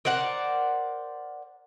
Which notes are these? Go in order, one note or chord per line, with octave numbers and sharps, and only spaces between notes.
A#4 C5 D5 F#5